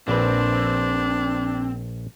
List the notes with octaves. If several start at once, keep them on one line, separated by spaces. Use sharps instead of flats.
A#1 C4 D4 B4